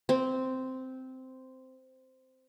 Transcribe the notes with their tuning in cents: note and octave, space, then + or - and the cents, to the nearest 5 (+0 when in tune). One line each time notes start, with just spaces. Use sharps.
C4 -10